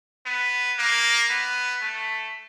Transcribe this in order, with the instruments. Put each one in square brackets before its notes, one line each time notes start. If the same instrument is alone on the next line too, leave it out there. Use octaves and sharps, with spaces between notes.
[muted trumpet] B3
A#3
B3
A3